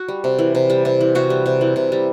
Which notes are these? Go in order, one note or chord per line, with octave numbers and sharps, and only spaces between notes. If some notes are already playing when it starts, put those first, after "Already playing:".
Already playing: F#4
G3
C3
E3
C3
G3
C3
E3
C3 F#4
G3
C3
E3
C3
G3